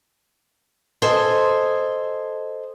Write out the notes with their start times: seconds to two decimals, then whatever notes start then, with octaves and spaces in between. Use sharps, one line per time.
1.02 A4 C5 D#5 G#5